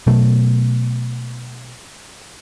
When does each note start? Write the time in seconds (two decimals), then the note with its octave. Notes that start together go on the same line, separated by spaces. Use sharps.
0.07 B2 F#3 A3